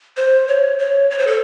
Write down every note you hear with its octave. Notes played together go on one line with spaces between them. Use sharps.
C5
C#5
C#5
C#5
C5
A4